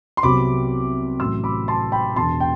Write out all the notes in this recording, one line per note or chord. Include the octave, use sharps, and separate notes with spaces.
C6
C2 C3 F#3 B3 B5 D6
A1 A2 F#3 C6 E6
B5 D6
A5 C6
G5 B5
E1 E2 B2 A5 C6
G5